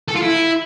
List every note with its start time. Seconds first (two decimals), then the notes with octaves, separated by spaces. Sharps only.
0.08 A4
0.15 F4
0.22 E4